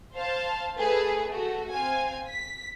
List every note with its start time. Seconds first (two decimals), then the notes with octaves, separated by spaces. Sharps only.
0.15 C5 F5 A5
0.77 A3 G#4 A4 B4
1.28 A3 F#4
1.73 C4 F5 G#5
2.29 B6